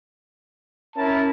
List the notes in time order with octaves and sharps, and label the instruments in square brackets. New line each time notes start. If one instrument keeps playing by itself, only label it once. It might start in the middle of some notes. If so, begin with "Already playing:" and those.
[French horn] C#4 [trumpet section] E4 A#4 A5